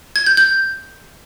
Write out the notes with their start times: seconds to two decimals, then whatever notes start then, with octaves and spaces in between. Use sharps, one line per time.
0.16 G#6
0.26 G6
0.37 G6